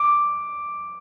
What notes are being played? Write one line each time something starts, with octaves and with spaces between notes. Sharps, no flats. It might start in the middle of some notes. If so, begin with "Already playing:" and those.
Already playing: D6